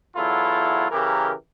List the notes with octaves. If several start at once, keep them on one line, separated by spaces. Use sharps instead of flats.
E2 F#3 E4 F4 A4
C#3 E3 G4 A#4